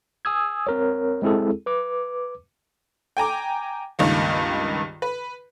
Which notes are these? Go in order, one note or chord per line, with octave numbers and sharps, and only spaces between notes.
G#5 D#6 E6 G#6
C4 A#4 C#5
G#3 C4 E4 G#4 A4
B4 D6
G5 G#5 A#5 D6
C#2 G2 D#3 A#3
B4